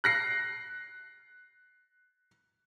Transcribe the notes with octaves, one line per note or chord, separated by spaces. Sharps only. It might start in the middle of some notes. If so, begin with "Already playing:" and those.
F#6 A#6 C7